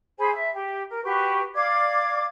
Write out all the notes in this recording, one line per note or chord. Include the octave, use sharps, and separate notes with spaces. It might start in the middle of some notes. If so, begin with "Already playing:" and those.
G#4 C5 G#5 B5
E5
G4
A#4
F#4 G4 B4 C#6
D5 F5 D6 G#6